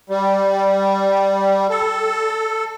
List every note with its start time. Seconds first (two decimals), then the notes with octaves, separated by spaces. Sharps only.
0.10 G3
1.70 A4